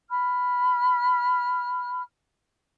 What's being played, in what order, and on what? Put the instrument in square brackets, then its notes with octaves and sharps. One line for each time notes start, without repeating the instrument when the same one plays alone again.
[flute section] B5 F6